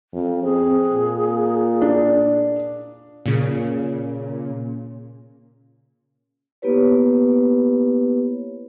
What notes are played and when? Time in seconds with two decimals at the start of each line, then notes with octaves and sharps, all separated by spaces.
0.13 F2
0.43 C4 G#4
0.93 A#2
1.82 D4
3.26 A#2 C#3
6.62 A#3 B3 E4 G4 B4 C#5